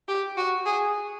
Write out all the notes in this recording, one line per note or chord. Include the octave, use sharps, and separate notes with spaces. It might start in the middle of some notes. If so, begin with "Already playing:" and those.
G4
F#4
G#4